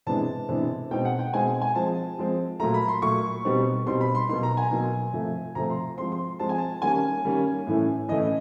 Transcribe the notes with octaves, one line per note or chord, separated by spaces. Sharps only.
C3 E3 G#3 B3 D4 A5
C3 E3 G#3 B3 D4
B2 G#3 C4 D#4 G5
F#5
G5
B2 G#3 C4 D#4 G#5
G#5
F3 G#3 C4 A5
F3 G#3 C4
A#2 F#3 A3 A#5
B5
C6
A#2 F#3 A3 C#6
B2 G3 C4 D#4
B2 G3 C4 D#4 C6
B5
C6
B2 F#3 A#3 D#4 C6
A#5
G#5
B2 F#3 A#3 D#4
C3 F3 A3
C3 F3 A3 A#5
C6
F3 G#3 C4 C6
C6
F3 G#3 C4 A5
G#5
A5
D#3 G3 A#3 C#4 G#5
D#3 G3 A#3 C#4
A2 E3 A3 C#4
A2 E3 A3 C#4 D#5